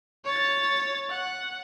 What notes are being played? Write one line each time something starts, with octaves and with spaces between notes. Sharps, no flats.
C#5 A6
F#5